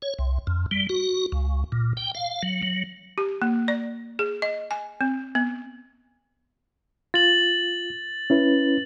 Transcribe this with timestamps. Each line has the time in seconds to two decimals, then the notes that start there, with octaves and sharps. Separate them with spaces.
0.02 C#5
0.19 C2
0.47 F2
0.71 G3
0.89 F#4
1.32 C#2
1.72 A#2
1.97 G5
2.15 F5
2.43 F#3
2.63 F#3
3.18 G4
3.42 A#3
3.68 D5
4.19 G#4
4.42 D#5
4.71 G#5
5.01 C4
5.35 B3
7.14 F4 A6 F#7
8.30 C#4 E4 B4